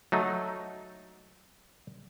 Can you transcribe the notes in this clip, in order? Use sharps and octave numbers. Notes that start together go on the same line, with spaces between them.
F#3 A3 D#4